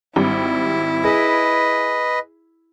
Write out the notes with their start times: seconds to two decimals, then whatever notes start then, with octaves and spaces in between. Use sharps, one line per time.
0.16 G#1 G3 E4
1.04 G#4 B4 D#5